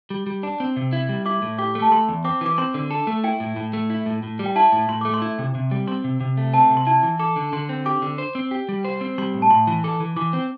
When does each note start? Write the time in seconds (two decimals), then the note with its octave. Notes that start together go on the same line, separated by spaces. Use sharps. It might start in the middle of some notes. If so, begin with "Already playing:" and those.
0.10 G3
0.27 G3
0.43 D4
0.60 C4
0.76 C3
0.93 E4
1.09 G3
1.26 E4 D6
1.42 A2
1.58 G4 D6
1.75 A3
1.82 A5
1.91 A3 C6
2.09 E2
2.24 C4 D6
2.41 E3 D6
2.58 C4 C6
2.74 D3
2.91 A4
3.07 A3
3.24 E4 G5
3.40 A2
3.56 A2
3.73 A3
3.90 E4
4.06 A2
4.23 A2
4.39 G3
4.46 G5
4.56 E4 A5
4.72 A2
4.89 A2 C6
5.01 A3 D6
5.14 C6
5.22 E4
5.39 C3
5.55 C3
5.71 G3
5.87 C4 C6
6.04 C3
6.20 C3
6.37 A3
6.53 C4 A5
6.70 C3
6.77 C6
6.87 E4 A5
7.03 E3
7.19 A4 D6
7.36 D3
7.53 D3 C6
7.69 C4
7.86 G4 D6
8.02 D3
8.18 C5
8.35 C4
8.51 G4
8.69 G3
8.85 C5
9.01 C4
9.18 G3 C6
9.34 A2
9.42 A5
9.50 A2 C6
9.67 E3
9.84 A4 D6
10.00 E3
10.16 E3 D6
10.33 C4